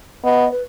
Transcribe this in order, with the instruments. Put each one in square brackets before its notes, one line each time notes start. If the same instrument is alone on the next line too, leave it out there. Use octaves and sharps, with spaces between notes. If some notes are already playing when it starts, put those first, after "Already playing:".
[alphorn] B3 [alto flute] D#5
[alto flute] B4